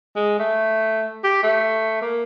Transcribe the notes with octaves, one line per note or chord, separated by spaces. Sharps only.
G#3
A3
G4
A3
A#3